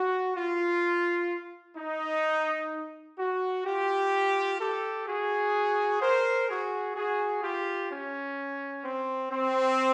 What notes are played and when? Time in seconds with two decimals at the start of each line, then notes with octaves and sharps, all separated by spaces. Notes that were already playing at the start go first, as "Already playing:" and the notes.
Already playing: F#4
0.36 F4
1.76 D#4
3.18 F#4
3.65 F4 G4
4.59 G4 A4
5.05 F#4 G#4
6.00 A#4 C5
6.47 F#4 G#4
6.95 F#4 G#4
7.42 F4 G4
7.89 C#4
8.83 C4
9.30 C4